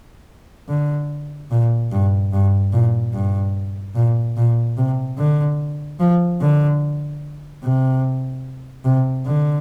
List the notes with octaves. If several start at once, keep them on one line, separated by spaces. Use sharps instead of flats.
D3
A#2
G2
G2
A#2
G2
A#2
A#2
C3
D3
F3
D3
C3
C3
D3